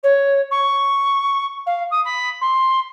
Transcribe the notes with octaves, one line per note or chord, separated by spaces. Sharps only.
C#5
C#6
F5
D#6
B5
C6